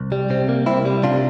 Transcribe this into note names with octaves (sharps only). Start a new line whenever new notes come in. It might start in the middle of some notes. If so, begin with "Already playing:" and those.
Already playing: C2
G3
C3 C4
A#3
C2 C4 E4
G3
C3 D4 F4